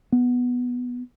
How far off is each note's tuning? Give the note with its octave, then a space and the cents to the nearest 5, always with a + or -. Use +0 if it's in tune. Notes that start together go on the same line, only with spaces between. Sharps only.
B3 +0